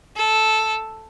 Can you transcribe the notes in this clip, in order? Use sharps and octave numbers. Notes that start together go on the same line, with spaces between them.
A4